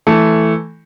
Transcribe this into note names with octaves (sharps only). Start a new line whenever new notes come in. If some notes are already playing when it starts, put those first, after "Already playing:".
E3 A3